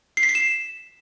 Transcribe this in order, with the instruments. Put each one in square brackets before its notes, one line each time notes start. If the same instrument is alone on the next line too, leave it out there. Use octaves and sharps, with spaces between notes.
[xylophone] C7
B6
C7
E7